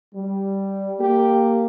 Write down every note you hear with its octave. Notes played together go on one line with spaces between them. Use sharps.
G3
A#3 G4